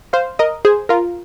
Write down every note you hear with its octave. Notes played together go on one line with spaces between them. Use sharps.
C5 F5
A#4 D#5
G#4 C5
F4 A#4